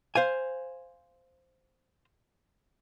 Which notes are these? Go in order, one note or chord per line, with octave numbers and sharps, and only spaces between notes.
C5 F5 G#5